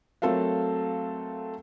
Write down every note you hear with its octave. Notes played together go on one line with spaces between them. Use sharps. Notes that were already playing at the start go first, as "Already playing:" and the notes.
F#3 A3 C4 A4 A#4 F5